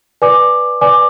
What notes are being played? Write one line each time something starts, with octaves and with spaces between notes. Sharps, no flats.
B4 D5 G#5 D6
B4 D5 G#5 D6